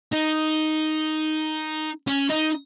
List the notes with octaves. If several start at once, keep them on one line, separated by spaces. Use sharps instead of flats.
D#4
C#4
D#4